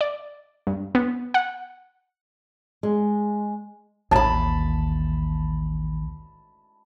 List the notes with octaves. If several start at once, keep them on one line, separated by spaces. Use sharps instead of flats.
D5
G2
B3
F#5
G#3
A1 D#2 A5 B5